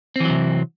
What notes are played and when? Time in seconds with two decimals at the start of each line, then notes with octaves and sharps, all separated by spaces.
0.16 C4
0.20 E3
0.25 F#3
0.30 C3